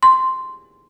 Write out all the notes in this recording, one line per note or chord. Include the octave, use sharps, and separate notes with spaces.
C6